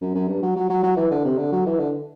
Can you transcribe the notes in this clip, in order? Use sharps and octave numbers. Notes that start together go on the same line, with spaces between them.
F#2
F#2
G2
F#3
F#3
F#3
F#3
E3
D3
C3
D3
F#3
E3
D3